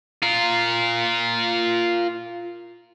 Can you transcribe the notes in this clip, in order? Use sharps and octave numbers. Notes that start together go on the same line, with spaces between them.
F4 A#4